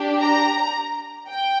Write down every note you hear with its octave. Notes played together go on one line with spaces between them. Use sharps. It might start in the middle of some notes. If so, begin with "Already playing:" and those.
Already playing: D4 G4
A#5
G5